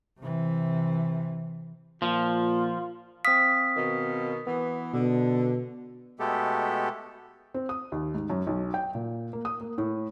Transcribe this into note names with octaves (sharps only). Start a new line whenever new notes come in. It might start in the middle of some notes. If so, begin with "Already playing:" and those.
C3 E3
A#2 F3 F4
C4 F5 D#6 B6
B2 D#3
E3 B3
B2 D3
B2 G#3 A3 B3 G4 A4
C4
D#6
D#2
G#2
F#2
B1
G5
A#2
A#3
D#6
A#3
A2